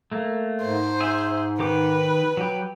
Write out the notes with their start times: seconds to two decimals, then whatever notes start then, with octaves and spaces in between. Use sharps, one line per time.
0.12 A3 A#3
0.61 G#2 C5
1.00 G#4 E5
1.60 D#3 G4 B4 D6
2.37 F#3 G4